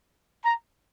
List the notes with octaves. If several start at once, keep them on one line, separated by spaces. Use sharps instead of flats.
A#5